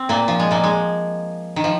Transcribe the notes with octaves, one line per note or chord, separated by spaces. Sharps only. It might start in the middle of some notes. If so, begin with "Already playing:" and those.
Already playing: C4
A#2 A#3
F3
G#3
A#2 A#3
G#3
D#3
F3